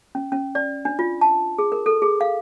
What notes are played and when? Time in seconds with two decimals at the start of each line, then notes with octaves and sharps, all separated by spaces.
0.15 C#4
0.32 C#4
0.55 D5
0.85 D4
0.99 F4
1.21 A5
1.58 G#4
1.72 A#4
1.86 A4
2.02 G#4
2.21 F5